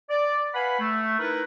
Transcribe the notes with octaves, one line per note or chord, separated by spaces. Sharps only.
D5
B4 F5 F#5 G#5 B5
A3
D#4 E4 A#4 B4